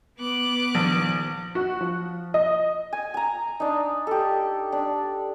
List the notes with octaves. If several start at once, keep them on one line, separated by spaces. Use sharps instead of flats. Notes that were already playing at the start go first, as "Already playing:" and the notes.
B3 D6 F#6
A#1 D#3 F3
F#4
F3
D#5
G#5
G#5 A#5
D4 D#4
G4 A4
D4